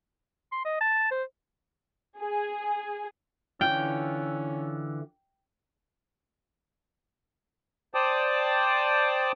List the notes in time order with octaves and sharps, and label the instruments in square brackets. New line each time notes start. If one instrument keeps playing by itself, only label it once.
[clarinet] C6
D#5
A5
C5
[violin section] G#4
[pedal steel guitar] D3 E3 F4 [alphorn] C#4 [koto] G5
[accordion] C5 D5 G5 A5 D6 D#6